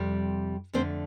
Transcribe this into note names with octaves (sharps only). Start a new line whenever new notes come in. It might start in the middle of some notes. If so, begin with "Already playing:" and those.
Already playing: F2 C3 G3
F2 D3 A3 C4 C5